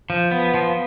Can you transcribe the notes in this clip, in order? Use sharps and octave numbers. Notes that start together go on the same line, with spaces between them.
F3
B3
F3